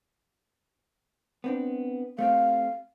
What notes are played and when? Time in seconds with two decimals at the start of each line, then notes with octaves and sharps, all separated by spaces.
1.44 B3 C4 D4
2.19 A3 C4 G4 F5